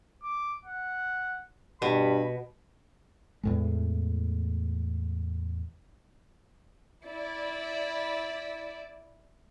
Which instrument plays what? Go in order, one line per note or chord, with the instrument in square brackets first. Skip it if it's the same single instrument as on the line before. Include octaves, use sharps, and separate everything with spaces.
[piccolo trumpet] D6
F#5
[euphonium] G2 [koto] B2 [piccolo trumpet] B5
[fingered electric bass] E2 A2 G#3
[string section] E4 D5